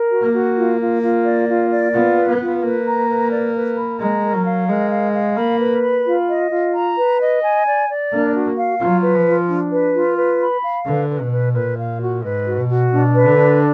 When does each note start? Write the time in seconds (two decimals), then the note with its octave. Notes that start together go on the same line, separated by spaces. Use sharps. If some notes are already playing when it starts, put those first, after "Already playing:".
Already playing: A#4
0.11 F#4
0.22 A#3
0.33 F#4
0.56 F4
0.80 F4
1.02 F4
1.25 D5
1.49 F4
1.71 D5
1.93 B3 F4
2.16 B4
2.28 B3
2.40 F4
2.62 A#3 B4
2.85 A#5
3.08 B4
3.31 D5
3.54 B4
3.76 B5
4.00 G#3 A#5
4.23 A#4
4.33 F#3
4.45 F5
4.69 G#3 A#4
4.91 F5
5.14 F5
5.36 A#3 B5
5.60 B4
5.83 B5
6.06 F4
6.29 D#5
6.51 F4
6.74 A#5
6.97 B4
7.20 D#5
7.43 G#5
7.66 D5
7.89 D5
8.12 A#3 D4
8.35 F#4
8.58 F5
8.80 F#3 F4
9.03 B4
9.15 F3
9.26 F4
9.49 D4
9.72 B4
9.94 F4
10.17 B4
10.40 B5
10.64 F5
10.86 D3 B4
11.08 B4
11.21 B2
11.32 B4
11.54 A#2 B4
11.78 F5
12.00 F#4
12.24 G#2 B4
12.46 F#4
12.57 B2
12.69 F#4
12.91 B2 D4
13.15 B4
13.26 D3
13.38 D4